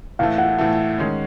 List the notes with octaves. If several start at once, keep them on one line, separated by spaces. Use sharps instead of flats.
A2 E3 A3 F5
F#5
A2 E3 A3
D#3 G#3 C#4